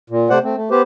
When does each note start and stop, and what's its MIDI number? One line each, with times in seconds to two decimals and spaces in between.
0.10 0.29 46
0.30 0.39 48
0.30 0.39 57
0.30 0.39 72
0.30 0.39 74
0.30 0.39 78
0.44 0.56 57
0.44 0.56 60
0.56 0.69 57
0.71 0.82 59
0.71 0.82 67
0.71 0.82 71
0.71 0.82 72